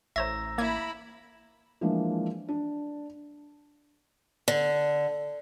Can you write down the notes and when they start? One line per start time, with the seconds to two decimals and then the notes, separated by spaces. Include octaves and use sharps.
0.16 A1 C5 C#5 E5 A#5 E6 A#6
0.58 A#3 E4 B5 G#6
1.81 E3 F3 G#3 A#3 D4
2.49 D4
4.48 D3